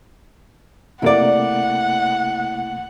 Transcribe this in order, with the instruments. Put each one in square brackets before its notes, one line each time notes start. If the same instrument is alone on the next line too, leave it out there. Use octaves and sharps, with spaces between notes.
[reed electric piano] C3 A3 A#3 [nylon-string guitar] E4 D5 [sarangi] F#5